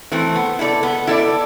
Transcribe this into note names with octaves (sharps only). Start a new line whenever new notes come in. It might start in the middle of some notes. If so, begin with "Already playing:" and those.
E3 A3 C4
B3
E4 A4 D5
B3
E4 A4 D5